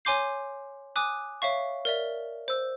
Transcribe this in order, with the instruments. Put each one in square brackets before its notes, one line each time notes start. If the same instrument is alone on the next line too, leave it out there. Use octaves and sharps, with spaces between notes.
[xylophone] C#5 G#5 C6 D6 G6 C7
G#5 D6 D#6 F#6
C#5 E5 F5 C#6
A#4 D5 E5
C5 E6